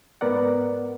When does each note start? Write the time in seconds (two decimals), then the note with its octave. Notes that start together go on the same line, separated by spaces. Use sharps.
0.21 G#2 B3 A#4 D5 F#5